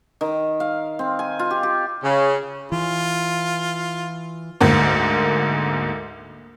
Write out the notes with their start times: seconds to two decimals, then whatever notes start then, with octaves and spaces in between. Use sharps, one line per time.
0.21 D#3
0.60 F5
0.99 C4
1.19 G#5
1.39 F4
1.51 G4
1.63 G4
2.04 C#3
2.72 E3 F4
4.61 D2 G#2 A#3